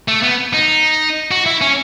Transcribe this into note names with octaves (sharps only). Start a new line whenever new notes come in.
A3
B3
D#4
F#4
E4
C#4